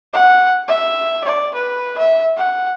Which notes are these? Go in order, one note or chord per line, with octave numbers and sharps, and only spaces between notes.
F#5
E5
D5
B4
E5
F#5